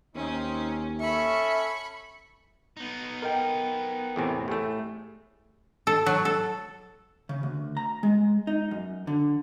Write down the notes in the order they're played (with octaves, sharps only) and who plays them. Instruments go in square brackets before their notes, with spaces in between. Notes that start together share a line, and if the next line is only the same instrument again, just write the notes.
[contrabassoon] D#2 [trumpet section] C4 D#4 [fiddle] C#4
[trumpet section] C#4 A4 [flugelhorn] E5 [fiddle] B5 C#6
[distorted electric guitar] B3 D#4
[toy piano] A4 D#5 F#5 [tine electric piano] A#4 G5
[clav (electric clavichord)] E2 A2 C3 [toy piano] G#4 G#5
[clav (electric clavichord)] A2 A3 [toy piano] G4 G#5 E6
[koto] A4
F#3
A4
[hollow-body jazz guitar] C#3
D2
A#5
G#3
D#4
F#2
D3